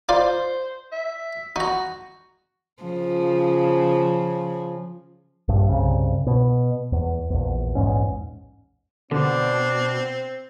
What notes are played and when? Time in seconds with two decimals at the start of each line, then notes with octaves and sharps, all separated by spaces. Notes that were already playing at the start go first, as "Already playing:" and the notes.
0.09 D#4 F4 C5 D5
0.92 E5
1.56 D#4 F#4 A#5
2.83 C#3 F3
5.48 A#1 G2
5.69 C2 G2 C#3
6.27 B2
6.92 E2
7.30 A#1 E2
7.75 A#1 E2 G#2 C#4
9.11 B2 D3 C4 D4